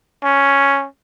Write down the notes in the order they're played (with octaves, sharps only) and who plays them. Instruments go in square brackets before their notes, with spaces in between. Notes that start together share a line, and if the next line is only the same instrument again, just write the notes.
[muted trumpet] C#4